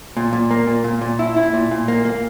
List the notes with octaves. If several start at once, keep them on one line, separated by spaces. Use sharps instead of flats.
A#2
A#2
A#3
A#2
A#2
A#2
E4
E4
A#2
A#2
A#3
A#3